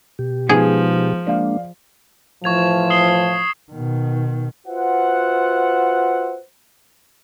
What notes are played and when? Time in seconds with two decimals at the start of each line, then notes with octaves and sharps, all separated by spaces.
0.19 B2 G4
0.49 F3 G#3 B3 D#4 G#4
1.27 G#3 A#3 D4 D5 F5
2.44 A2 E3 F3 C#6 G#6 F7
2.90 D#6 C7 G7
3.72 B2 D#3
4.67 F4 F#4 B4 C5 E5 F#5